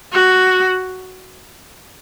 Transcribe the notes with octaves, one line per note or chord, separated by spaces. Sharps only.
F#4